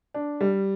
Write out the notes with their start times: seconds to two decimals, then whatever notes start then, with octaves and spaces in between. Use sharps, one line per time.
0.14 D4
0.41 G3